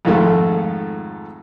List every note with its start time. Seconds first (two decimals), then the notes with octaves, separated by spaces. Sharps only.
0.05 F2 G#2 D#3 F3 G#3 A3